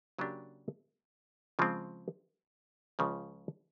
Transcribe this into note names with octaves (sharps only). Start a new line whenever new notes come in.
C#3 F#3 A#3 D4 G4
C#3 F3 G#3 C4
C#2 C#3 F3